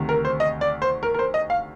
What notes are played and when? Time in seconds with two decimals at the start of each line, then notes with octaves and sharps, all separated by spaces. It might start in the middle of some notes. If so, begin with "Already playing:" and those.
Already playing: D2 C3 D#3
0.09 A#4
0.25 C5
0.40 D#5
0.61 D5
0.82 C5
1.03 A#4
1.14 A#4
1.19 C5
1.34 D#5
1.50 F5